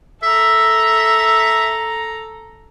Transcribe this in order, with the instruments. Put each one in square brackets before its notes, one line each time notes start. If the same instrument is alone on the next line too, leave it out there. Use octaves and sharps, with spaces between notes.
[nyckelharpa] A4 A#5 [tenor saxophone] E5